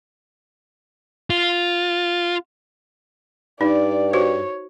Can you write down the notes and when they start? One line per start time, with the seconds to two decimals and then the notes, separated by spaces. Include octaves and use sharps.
1.30 F4
3.61 G2 D#4 D5
4.13 F#4 C5 C#5